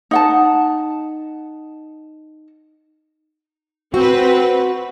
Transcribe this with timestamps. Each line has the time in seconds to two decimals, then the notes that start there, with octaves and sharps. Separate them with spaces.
0.11 D#4 F#5 A5
3.94 C4 F#4 B4